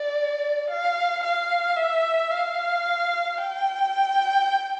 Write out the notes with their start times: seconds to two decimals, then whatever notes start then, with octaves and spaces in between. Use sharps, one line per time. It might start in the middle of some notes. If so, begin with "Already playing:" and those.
Already playing: D5
0.70 F5
1.24 F5
1.77 E5
2.31 F5
3.38 G5